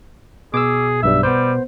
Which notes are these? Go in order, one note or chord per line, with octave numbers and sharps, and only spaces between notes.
B2 G#4 D6 E6
B1 G2 G3 E5
G3 B3 C5